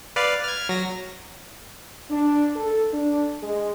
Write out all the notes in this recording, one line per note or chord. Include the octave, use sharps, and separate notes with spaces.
B4 D5 F5
F6 G#6
F#3 A#6
D4
A4
D4
G#3